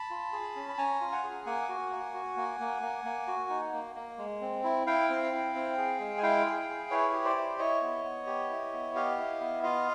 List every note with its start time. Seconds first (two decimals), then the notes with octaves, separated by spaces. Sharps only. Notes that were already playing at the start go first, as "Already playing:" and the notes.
Already playing: A5 B5
0.10 F4
0.33 G#4
0.56 C#4
0.70 B5
0.78 C#4 G#5 A#5
1.01 F4
1.12 F#5 G#5
1.24 G#4
1.46 A#3 F#5 G#5
1.69 F#4
1.91 A#3
2.14 F#4
2.37 A#3
2.60 A#3
2.82 A#3
3.05 A#3
3.28 F#4
3.50 D#4
3.73 A#3
3.96 A#3
4.18 G#3
4.41 C4
4.64 E4
4.87 E4 F5 G5
5.10 C4
5.32 E4
5.55 C4
5.78 G#4
6.00 G#3
6.18 G#5
6.23 E4 F5 G5
6.46 G#4
6.68 G#4
6.91 E4 B4 C#5
7.13 G4
7.25 C5 D5
7.36 E4
7.59 E4 C#5 D#5
7.82 B3
8.05 B3
8.27 G4
8.50 E4
8.73 B3
8.95 G4 D#5 F5
9.18 E4
9.41 B3
9.63 F4 D#5 F5